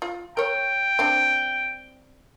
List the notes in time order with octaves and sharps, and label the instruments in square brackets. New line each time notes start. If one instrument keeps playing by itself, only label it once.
[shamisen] F4
[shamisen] A#4 C#5 [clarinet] G5
[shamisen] C4 D4